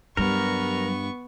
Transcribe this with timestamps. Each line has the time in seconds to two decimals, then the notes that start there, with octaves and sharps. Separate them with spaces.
0.17 G2 F#3 G3 B3 A#4 C#6